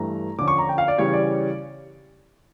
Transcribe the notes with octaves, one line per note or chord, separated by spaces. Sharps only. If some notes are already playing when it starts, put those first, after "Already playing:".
Already playing: G2 E3 A3 A#5
D3 F3 C#4 D6
C#6
A#5
G5
F5
D5
C#3 E3 G3 C#4 C#5
D5